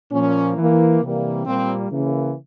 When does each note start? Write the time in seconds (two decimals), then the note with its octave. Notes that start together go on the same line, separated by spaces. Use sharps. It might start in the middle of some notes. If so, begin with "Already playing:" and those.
0.11 A#2 F3 A#3 C#4
0.57 E3 A#3
1.01 C3 E3 G3 A#3
1.46 A#2 G3 A#3 C4
1.91 C#3 E3 A#3